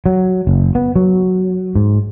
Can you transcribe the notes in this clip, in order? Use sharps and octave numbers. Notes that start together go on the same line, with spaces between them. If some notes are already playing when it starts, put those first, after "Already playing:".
F#3
F#1
B3
F#3
G#2